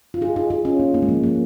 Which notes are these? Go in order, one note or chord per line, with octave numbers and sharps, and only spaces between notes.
F4
D#4 G#4
D#4 G#4
D#4 G#4
C#4 F4
A#3 D#4
A#3 D#4
G#3
F3 A#3
F3 A#3